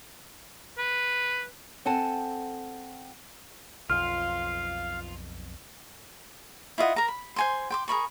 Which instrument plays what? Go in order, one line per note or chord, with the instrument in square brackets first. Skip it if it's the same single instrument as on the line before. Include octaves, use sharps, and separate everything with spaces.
[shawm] B4
[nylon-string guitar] C4 A4 F#5 G#5 A5
[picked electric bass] B1 F2 [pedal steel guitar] F4 [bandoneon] F5 [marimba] F6
[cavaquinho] E4 F4 D#5 F#5
A#4 A#5
B5
C5 G#5 C6
G5 C6 D6
G#4 A#4 B5 C#6